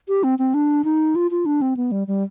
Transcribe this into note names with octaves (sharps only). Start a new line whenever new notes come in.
G4
C4
C4
D4
D#4
F4
F4
D4
C4
B3
G3
G3